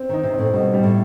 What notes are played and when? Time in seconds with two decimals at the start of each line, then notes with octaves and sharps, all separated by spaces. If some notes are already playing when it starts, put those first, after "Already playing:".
Already playing: C4
0.09 D#3 D#4
0.23 C3
0.34 A2 C4
0.54 B2 G3
0.74 G3
0.83 A2